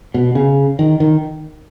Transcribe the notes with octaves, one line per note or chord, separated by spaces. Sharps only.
B2
C#3
D#3
D#3